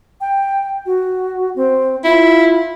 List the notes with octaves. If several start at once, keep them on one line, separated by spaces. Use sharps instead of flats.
G5
F#4
C4
E4 F4